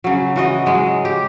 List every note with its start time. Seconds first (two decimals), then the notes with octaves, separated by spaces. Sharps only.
0.04 C#3 F#3
0.36 E3 F#4 D#5
0.66 F#3 G#3
1.05 G4